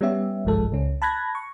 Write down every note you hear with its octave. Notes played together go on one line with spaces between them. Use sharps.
G3 B3 C#4 G4 E5
G1 C2 G#2 F3 G#3 A4
C#2 C#4
A5 B5 F#6 G#6 A#6
C#6